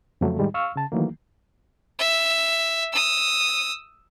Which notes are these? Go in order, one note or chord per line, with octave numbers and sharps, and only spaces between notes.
F2 C#3 F3 F#3 A3
A2 D#3 G3 G#3
F5 C#6 E6 F6
C#3 A5
D#3 E3 F#3 A3 A#3
E5
D#6 E6